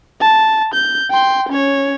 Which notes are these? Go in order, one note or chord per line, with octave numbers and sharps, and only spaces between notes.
A5
G6
G5 C6
C#4 C#5